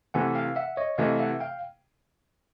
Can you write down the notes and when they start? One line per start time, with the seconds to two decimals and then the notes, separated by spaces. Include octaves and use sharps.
0.14 C3 E3 A3 F#5 G#5
0.35 F5 G5
0.56 E5 F#5
0.77 C#5 D#5
0.98 C3 E3 A3 D#5 F5
1.19 E5 F#5
1.40 F5 G5